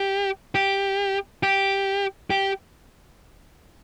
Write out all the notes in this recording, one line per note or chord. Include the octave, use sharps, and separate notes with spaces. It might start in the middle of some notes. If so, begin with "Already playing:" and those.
Already playing: G4
G4
G4
G4